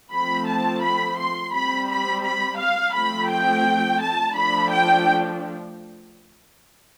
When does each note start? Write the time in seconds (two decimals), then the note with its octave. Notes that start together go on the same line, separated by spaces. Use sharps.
0.11 F3 A3 C4 B5
0.46 A5
0.81 B5
1.17 C6
1.52 G3 C4 B5
1.88 B5
2.23 B5
2.58 F5
2.93 F3 A3 C4 B5
3.30 G5
4.00 A5
4.35 F3 A3 D4 B5
4.71 G5